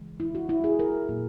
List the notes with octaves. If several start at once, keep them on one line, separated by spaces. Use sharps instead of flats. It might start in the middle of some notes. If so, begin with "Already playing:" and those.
Already playing: C#3 E3 G#3
E4
F#4
E4
G#4
A#4
A#2 F#3 A#3